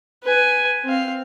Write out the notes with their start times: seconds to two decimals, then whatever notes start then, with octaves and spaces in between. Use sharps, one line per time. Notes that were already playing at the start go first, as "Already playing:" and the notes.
0.23 B4 G#5
0.84 C4 F5